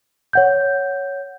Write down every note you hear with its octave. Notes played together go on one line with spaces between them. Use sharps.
C#5 F#5 G6